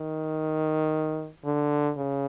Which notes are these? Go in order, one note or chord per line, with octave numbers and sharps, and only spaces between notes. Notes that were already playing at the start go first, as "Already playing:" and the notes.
Already playing: D#3
D3
C#3